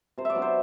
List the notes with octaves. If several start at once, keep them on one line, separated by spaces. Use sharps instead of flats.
C3 C5
D5 E5
F#3 B3 D4
C5